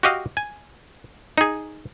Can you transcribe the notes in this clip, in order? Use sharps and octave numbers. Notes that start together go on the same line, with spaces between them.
F#4 G4 D#5 F5
G#5
D#4 G#4